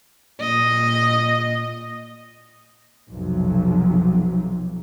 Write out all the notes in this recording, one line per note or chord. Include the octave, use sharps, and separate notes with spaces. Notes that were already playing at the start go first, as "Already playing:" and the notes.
A#2 D#5
B1 F2 C3 F3 F#3